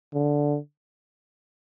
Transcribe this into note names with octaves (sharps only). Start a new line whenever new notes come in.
D3